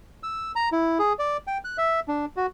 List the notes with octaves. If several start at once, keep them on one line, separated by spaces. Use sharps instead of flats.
E6
A#5
E4
G#4
D5
G5
F#6
E5
D4
F#4